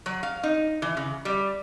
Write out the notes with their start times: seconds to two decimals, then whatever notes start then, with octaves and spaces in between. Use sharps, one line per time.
0.06 F#3
0.23 F5
0.43 D#4
0.82 E3
0.97 C#3
1.25 G3